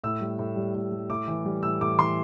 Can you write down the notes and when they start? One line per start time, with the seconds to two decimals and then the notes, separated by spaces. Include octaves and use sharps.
0.04 A2 E6
0.21 G3
0.39 A2
0.56 G3
0.75 A2
0.92 G3
1.10 A2 D6
1.28 E3
1.45 G3
1.63 A2 E6
1.81 A2 D6
1.98 E3 C6